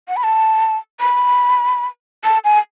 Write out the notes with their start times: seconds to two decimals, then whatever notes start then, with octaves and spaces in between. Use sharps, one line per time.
0.08 F#5
0.17 B5
0.23 A5
1.00 B5
2.24 A5
2.44 G#5